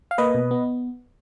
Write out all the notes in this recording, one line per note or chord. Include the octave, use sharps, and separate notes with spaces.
F5
A#3 B4 D#5
B2
B3